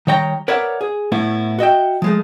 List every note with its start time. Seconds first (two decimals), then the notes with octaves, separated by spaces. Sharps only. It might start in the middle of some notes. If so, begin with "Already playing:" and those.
0.07 D#3 G3 C#5 G5 A#5
0.48 A#4 B4 C#5 D5 E5 F#5
0.81 G#4
1.12 A2 A3 B3 E4
1.59 F#4 D#5 E5 G5
2.02 F3 G#3 A3